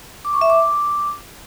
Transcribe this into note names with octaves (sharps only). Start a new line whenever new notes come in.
D6
C#6
E5
D6